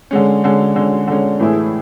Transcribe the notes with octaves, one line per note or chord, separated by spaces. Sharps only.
D3 G#3 C#4
D3 G#3 C#4
D3 G#3 C#4
D3 G#3 C#4
A2 E3 A3 E4 G#4